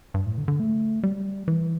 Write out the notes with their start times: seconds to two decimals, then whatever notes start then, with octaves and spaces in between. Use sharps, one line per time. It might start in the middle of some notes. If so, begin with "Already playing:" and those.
0.14 G2
0.26 A2
0.38 D3
0.48 D3
0.60 A3
1.03 G3
1.48 E3